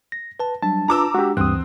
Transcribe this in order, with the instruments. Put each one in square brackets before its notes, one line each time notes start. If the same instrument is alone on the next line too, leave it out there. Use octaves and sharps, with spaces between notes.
[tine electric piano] A#6
B4 A5
[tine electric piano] F#3 G3 D4 [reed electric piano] A5
[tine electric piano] D4 F4 B4 [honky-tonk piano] A#5 D6 E6
[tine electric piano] G#3 D4 [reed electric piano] F#4 G4
[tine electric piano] D2 E3 F#6 [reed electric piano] G2 D#6 [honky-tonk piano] C4